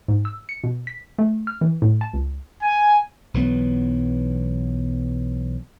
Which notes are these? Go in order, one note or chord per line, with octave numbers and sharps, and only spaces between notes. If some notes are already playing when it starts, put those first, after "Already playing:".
G#2
E6
C#7
B2
B6
A3
F6
E3
A2
A5
C#2
G#5
B1 E3 F#3 B3